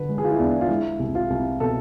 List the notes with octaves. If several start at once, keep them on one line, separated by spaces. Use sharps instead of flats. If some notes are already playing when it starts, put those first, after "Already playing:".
Already playing: D3 B4
G#3
G#4
F4
E4
E2 D4
F4
G#3 E4
C2
F4
C2
B2 A4